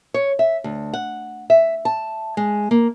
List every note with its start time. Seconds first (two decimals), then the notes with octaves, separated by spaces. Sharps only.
0.14 C#5
0.39 E5
0.64 D2
0.94 F#5
1.50 E5
1.85 A5
2.37 G#3
2.71 A#3